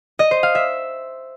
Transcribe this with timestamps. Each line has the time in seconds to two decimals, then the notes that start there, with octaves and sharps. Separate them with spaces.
0.19 D#5
0.31 C5
0.43 F5
0.55 E5